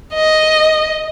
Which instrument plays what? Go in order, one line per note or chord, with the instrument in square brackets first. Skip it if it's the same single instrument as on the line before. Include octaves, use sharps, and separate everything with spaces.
[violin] D#5